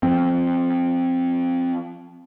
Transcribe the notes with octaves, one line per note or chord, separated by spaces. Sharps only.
F3 C4